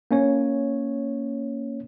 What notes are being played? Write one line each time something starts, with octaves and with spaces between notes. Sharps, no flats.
A#3 C#4 C#5